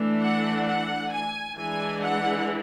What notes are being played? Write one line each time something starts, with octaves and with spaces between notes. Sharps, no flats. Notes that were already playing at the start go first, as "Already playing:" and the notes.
Already playing: E3 A3 D4
F#5
F#5
G#5
E3 G#3 D4 G#5
F#5